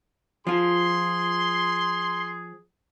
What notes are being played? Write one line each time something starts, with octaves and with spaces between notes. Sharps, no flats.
F3 F4 G#4 C6